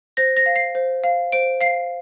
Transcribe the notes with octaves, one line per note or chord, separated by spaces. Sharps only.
C5 A#6
A#6
F5
C7
C5
F5
C5 D7
F5 C7